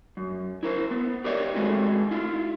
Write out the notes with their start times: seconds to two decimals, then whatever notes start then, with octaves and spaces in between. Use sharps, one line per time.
0.17 F#2
0.63 E4 A#4 C5
0.91 B3
1.24 G4 A#4 C#5 D5 E5
1.55 G#3 A3 C4 F#4 G#4
2.11 E4 F4